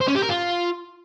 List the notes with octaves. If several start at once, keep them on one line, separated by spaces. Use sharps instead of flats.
C5
C#4
G4
A#4
F4